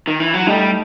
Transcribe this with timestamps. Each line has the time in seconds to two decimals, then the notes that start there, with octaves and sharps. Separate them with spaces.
0.07 D#3
0.20 E3
0.34 F#3
0.47 G3 A3 D#4 A4